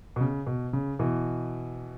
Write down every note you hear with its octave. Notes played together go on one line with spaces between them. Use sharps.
B2
C#3
B2
C#3
B2 E3